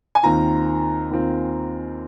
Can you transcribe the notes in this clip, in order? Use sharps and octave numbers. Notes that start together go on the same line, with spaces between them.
G#5
D#2 D#3 C4 F4 A#5
D#2 D#3 C4 F4